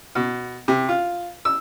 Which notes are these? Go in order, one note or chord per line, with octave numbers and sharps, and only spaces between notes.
B2
C3
F4
E6